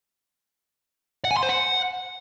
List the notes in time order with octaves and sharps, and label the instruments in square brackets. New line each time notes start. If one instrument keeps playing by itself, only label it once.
[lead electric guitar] F#5
G#5
C6
C5
F#5